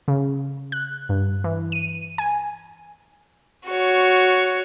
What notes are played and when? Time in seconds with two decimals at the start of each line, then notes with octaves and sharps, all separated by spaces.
0.08 C#3
0.72 F#6
1.09 G2
1.44 E3
1.72 D#7
2.18 G#5
3.70 F#4 C#5